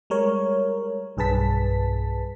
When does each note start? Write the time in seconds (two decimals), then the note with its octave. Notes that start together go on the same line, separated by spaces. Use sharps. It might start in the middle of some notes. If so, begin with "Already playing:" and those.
0.10 G3 G#3 A#4 C#5
1.17 B1 G2 G#4 B4 A5 B6